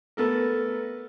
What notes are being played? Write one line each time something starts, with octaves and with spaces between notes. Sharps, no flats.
A3 B3 A4 A#4